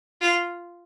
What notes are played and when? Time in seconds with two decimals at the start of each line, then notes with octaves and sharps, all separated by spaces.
0.21 F4